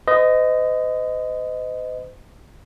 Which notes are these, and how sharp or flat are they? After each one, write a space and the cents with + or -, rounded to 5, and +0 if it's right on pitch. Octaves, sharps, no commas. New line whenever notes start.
C5 -45 D#5 +0